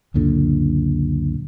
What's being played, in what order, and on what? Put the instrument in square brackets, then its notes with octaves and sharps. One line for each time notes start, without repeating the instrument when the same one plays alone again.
[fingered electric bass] C#2 F#2 A#2 D3